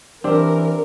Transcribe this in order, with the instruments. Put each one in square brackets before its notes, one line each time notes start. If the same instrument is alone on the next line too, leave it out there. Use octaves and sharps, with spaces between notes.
[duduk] E3 [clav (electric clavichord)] C4 G4 [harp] D4 [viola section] A#4